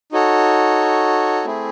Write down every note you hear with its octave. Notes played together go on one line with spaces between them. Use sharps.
D#4 F#4 A4 C#5
A3 C4 E4 G#4